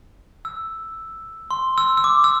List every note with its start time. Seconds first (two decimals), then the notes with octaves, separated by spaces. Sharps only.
0.45 E6
1.51 C6
1.78 E6
1.97 E6
2.04 D6
2.24 E6